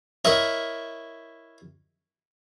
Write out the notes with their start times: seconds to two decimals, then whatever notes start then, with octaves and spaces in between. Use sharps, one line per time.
0.25 E4 A#4 C#5 D#5 E5